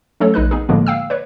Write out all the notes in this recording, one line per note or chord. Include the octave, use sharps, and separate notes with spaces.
F#3 A3 C#4 A4 C#5
A#1 D#4 B4 F#6
B3 D#4 G#4
A2 D3 F3 G#3 A#3 B3
F5 G5 E6
B4 C#5